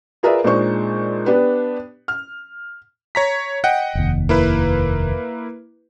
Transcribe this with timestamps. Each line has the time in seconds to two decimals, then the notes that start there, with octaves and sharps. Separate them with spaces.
0.23 F4 G#4 A#4 B4 D5 E5
0.44 A#2 G#3 D4 D#4 C5 C#6
1.26 B3 D4 G4 B4
2.08 F6
3.15 C#5 A#5 B6
3.64 D#5 F#5 G5
3.95 F1 D#2
4.29 A#3 E4 B4